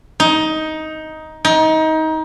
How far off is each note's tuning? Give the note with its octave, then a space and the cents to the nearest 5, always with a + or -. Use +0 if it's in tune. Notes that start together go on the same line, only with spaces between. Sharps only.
D#4 +10
D#4 +25